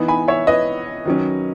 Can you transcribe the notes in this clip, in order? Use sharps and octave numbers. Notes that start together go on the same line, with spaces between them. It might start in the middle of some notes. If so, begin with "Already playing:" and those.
Already playing: E3 B3 D#4
G#5 B5
C#5 E5
B4 D#5
D#3 F#3 C#4